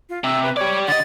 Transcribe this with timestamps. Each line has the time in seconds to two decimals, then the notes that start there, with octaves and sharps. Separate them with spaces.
0.09 F4
0.24 C3 E6
0.43 B4
0.57 G4 C#5 D5
0.88 D3 D#5 A6